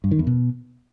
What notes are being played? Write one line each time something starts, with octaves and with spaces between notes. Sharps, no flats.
G2
D#3
E2
B2